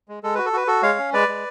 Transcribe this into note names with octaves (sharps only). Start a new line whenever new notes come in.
G#3
G#3 A4
F#4 B4
A4
F#4 B4
F#4 A4
G#3 C#5 F5
C#4
G#3 B4 D5
G#3